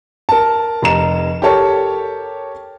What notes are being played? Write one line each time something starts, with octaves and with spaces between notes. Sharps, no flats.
A#4 A5
F1 A#5 E7
G4 A4 A#4 C#5 A5